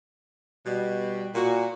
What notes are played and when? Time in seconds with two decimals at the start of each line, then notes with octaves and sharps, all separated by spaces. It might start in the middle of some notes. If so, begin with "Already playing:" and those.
0.66 B2 G3
1.35 A#2 F#4